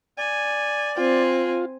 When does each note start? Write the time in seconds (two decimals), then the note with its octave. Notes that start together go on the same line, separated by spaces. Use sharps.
0.18 D5 G#5
0.97 C4 F4 G#5